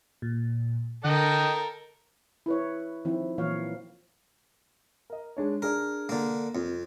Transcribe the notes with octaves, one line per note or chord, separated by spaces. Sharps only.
A#2
D3 A4 A#4 D#5 G5
E4 B4 C#5
D#3 F3 C4 E4
A#2 E3 F#3 A#3 C#5 F5
A#4 D#5
G#3 D4 C#5
D4 G#4 A#4 D5
D3 A#3
F2 C4